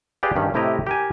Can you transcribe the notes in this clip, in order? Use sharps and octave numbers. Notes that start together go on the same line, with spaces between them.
G4 G#4 B4 D5 F5 G5
G2 D#3 C#4
A2 C3 E4 G4 D#5 A#5
G4 A#4 G#5